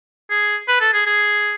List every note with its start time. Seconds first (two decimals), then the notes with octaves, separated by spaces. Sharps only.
0.31 G#4
0.68 B4
0.81 A4
0.93 G#4
1.06 G#4